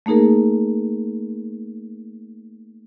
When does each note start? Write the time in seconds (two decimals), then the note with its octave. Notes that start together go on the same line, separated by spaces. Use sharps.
0.06 A3 A#3 D#4 G#4 A#4